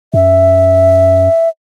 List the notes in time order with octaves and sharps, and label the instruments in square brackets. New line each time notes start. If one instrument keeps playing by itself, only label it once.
[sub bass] F#2 [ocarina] E5